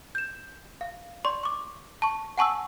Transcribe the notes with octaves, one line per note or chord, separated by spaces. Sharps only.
G6 E7
F5
D5 C6 C#6
C#6 D6
A5 C#6
F#5 G#5 A5 C#6 D#6 E6